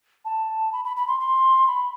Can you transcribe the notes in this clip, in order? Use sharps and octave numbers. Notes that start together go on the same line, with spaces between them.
A5
B5
B5
B5
C6
C6
B5